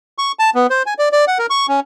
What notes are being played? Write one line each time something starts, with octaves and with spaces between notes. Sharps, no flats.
C#6
A5
B3
C5
G#5
D5
D5
F#5
A#4
C#6
C#4